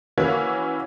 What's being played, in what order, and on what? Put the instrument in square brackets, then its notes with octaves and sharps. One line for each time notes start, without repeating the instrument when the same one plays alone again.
[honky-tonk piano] E3 A#3 C#4 E4 F#4